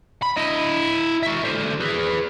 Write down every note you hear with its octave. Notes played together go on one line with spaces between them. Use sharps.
B5
E4 D#5
F#4 E5
D3 C5
G#4 B4